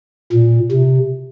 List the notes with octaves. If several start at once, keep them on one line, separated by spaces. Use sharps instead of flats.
A#2
C3